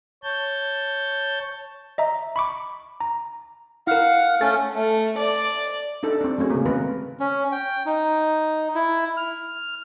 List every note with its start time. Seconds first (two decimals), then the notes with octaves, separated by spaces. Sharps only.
0.24 C#5 A5 G6
1.98 D#5 E5 A#5
2.36 B5 C#6 D6
3.00 A#5
3.87 E4 A#4 F5 F#5
4.41 A3 C#4 A4 A6
4.73 A3
5.18 D5
6.03 D4 D#4 A4
6.21 C4 D4
6.38 F#3 A3 C#4 G#4
6.50 C#3 A#3
6.65 D#3 G#3 B3 C4 A#4 B4
7.20 C#4
7.52 G5
7.86 D#4
8.75 E4
9.17 F6